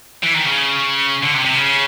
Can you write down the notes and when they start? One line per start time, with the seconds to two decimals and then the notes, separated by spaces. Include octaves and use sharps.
0.23 E3
0.35 D#3
0.46 C#3
1.23 D3
1.34 C3
1.45 C3
1.55 C#3